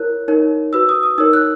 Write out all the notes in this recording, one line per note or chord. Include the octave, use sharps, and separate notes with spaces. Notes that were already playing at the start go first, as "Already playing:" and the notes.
Already playing: E4 A#4 C#5 F#6
D#4 A#4 C#5
F#4 B4 E6
D#6
D#6
D#4 A#4 C#5 E6
F#6